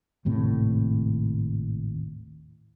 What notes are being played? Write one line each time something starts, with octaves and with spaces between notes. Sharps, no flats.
G#1 D#2 A2 C3